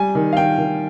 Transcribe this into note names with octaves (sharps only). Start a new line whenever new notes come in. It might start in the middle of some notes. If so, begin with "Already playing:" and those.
Already playing: G3 G#5
D#3
F5
D#3 G5
D#3